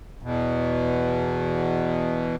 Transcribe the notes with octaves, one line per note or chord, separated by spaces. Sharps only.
E2 B2